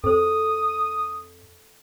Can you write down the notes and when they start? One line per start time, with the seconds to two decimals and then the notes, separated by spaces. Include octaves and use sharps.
0.04 F2 A4 C5 D#6